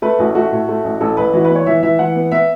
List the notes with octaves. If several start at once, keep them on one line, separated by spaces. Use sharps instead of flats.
A3 B4
A1 F#4
A3 F#4
A2
A3
A1
A1 A4
A1 B4
E3 F#4
B4
B3 C#5
E3 E5
E3 E5
E3 F#5
B3
B3 E5